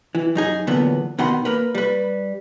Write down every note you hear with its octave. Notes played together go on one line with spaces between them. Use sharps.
E3
F#2 D#4 G#4
E2 A#2 D3 F#3 B3
B2 D#3 F#5 B5 C6
A#3 A#4 B4
G3 B4